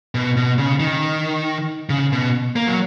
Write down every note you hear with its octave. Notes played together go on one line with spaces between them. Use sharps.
B2
B2
C#3
D#3
C#3
B2
A#3
F#3